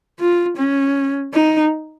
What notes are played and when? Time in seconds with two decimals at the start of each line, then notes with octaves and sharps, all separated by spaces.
0.19 F4
0.57 C#4
1.34 D#4